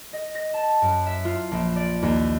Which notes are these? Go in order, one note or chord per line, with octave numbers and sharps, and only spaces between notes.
D#5
A#6
A5
F#2
E5
F4
A#1
D5
D#2